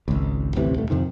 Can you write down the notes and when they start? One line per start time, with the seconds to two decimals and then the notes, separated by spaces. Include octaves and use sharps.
0.08 G#1 C#2
0.55 A1 D2 C3 E3
0.74 D#1 A3
0.90 F2 C3 D#3